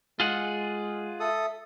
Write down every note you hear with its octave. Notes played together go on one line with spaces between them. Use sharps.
G#3 F4 G#4 F#5
A4 E5 D#6